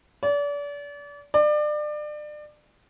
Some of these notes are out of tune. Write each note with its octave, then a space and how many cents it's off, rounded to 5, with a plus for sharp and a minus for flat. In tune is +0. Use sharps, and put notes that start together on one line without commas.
D5 -35
D5 +30